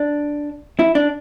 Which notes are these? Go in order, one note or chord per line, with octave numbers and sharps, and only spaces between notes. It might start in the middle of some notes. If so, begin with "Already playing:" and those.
Already playing: D4
E4
D4